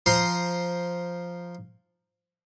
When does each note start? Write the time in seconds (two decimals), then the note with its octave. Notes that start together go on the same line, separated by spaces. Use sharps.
0.06 F3 C5 A#5 C6 D#6